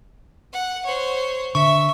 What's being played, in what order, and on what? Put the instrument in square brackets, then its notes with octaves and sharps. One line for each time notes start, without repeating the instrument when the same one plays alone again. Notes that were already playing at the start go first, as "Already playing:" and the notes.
[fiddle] F#5
C5 C#5
[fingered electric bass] D3 [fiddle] E5 [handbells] C#6